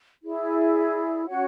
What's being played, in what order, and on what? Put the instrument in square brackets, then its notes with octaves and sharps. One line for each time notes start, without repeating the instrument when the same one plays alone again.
[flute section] E4 G#4 D5
C#4 F#4 C#5 F#5